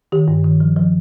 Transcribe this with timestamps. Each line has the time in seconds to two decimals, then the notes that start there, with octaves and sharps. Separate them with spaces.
0.12 D#3 G4
0.28 G2
0.44 D#3
0.60 F3
0.77 F3